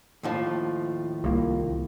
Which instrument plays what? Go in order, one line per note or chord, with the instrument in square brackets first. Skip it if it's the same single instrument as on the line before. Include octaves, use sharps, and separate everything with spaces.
[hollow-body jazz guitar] D#2 A2 F3 [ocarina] F4
[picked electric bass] C2 A#3